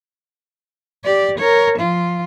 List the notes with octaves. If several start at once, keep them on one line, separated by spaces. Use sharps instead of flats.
G4 D5
A#4 C#5
F3 F4